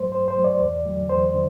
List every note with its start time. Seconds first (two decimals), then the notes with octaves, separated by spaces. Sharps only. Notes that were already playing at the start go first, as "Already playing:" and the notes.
Already playing: G2 F#3 A3 C5
0.11 G2 C5
0.28 C5
0.36 F#3 A3
0.44 D5
0.61 E2
0.85 D3 F#3 A3
1.09 E2 C5
1.34 D3